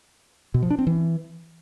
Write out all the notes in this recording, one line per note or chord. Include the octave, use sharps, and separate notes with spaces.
B2
F3
D4
C4
E3